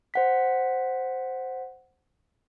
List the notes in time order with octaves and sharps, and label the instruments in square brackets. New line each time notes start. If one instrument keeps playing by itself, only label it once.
[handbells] C5 F#5 B6